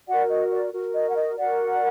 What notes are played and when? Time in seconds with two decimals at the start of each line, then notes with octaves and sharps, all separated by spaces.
0.07 F#4 A#4 D5 F#5
0.29 D#5
0.51 D5
0.73 F#4 A#4
0.94 D#5
1.09 F#5
1.16 D#5
1.38 F#4 A#4 D5 F#5